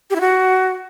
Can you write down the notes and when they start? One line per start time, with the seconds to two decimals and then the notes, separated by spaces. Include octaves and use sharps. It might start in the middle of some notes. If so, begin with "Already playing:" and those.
0.10 G4
0.15 E4
0.21 F#4